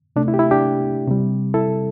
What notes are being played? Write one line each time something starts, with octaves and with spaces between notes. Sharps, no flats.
C3 A3 D4
E4
G4
E4
D4 G4
C3 G3
E4 A4